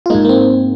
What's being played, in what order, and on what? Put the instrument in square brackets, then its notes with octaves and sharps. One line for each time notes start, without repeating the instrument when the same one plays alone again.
[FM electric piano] F4
G#2 G#3 A#3 D#4
A#3
C4